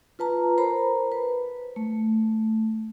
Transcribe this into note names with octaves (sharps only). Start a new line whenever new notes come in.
F4 B4 A5 A#5
A#4 C5 A#5 B5
B4
A3